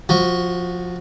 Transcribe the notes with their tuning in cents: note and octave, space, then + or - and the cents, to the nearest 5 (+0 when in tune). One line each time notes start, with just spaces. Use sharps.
F3 +20 F#4 +0